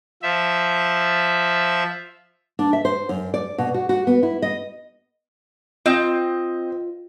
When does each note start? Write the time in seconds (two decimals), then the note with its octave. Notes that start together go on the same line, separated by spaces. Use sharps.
0.22 F3 E5
2.59 D4
2.73 E5
2.85 C5
3.09 F#2
3.34 D5
3.58 B2
3.74 F#4
3.89 F#4
4.07 B3
4.23 E4
4.42 D#5
5.86 C4 F4 D#5